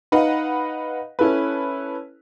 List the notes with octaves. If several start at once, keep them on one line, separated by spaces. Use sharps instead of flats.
D#4 B4 D#5 F5 F#5
C#4 E4 A4 B4